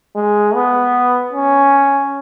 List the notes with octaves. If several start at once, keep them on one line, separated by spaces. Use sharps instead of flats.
G#3
B3
C#4